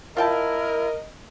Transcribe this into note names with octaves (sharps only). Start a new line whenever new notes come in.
E4 F4 A#4 D#5 G5 A5